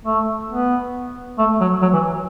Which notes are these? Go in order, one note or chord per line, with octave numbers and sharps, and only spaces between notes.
A3
B3
A3
F#3
F#3
E3